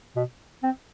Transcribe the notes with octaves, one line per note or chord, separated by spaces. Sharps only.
B2
C4